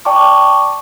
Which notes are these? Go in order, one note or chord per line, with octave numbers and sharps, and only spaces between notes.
D5 G5 A5 C#6 D6